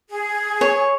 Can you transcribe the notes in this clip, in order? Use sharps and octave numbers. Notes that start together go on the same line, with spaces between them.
G#4
C#5